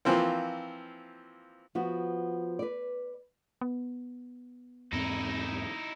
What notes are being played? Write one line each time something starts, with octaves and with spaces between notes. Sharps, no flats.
E3 F3 A#3 C4
F3 B3 F#4
B4 D5
B3
E2 G#2 C4 D#4 E4